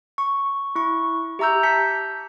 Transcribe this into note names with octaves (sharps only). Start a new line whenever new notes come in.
C#6
E4 C#6
G4 E5 A#5 E6 G6
A5 G6 B6 C#7